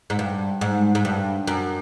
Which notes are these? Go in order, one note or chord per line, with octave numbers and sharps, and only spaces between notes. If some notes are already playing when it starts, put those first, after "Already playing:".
G#2
G2
G#2
G#2
G2
F#2